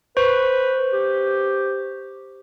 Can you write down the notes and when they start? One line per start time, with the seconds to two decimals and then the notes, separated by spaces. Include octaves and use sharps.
0.17 B4 C5 C#6
0.92 G4